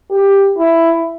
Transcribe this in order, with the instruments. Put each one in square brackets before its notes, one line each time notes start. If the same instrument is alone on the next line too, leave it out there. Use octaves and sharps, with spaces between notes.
[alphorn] G4
E4